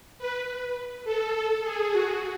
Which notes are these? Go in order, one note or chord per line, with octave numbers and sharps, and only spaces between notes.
B4
A4
A4
G#4
F#4